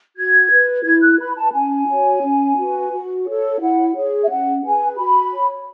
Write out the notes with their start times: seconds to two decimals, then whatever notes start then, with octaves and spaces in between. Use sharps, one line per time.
0.16 F#4 G#6
0.51 B4
0.84 E4 G#6
1.02 F#6
1.19 B4 B5
1.36 A5
1.53 C#4 G#5
1.89 F#4 C#5
2.23 C#4
2.57 F#4 B4
2.92 F#4
3.26 A4 C#5
3.60 E4 F#5
3.95 G#4 C#5
4.24 E5
4.30 C#4 F#5
4.63 G#4 B4 G#5
4.98 F#4 B5
5.33 C#5